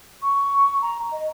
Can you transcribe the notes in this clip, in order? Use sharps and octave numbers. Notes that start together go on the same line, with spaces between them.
C#6
A#5
D#5